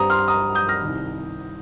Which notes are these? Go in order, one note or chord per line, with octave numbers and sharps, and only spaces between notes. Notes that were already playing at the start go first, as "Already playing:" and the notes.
Already playing: G2 G3 C4 A#5 D#6
C6 F6
A#5 D#6
D#6 G6
F6 A#6
C2 C3 D#3